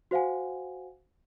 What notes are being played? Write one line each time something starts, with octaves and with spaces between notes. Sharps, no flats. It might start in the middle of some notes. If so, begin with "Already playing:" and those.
F#4 C5 F5 F#5 G#5